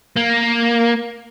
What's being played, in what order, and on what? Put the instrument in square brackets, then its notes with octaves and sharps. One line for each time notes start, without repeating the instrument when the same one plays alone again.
[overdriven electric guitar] A#3